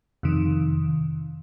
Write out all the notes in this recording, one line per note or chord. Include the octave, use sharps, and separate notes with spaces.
F2 C3 D#3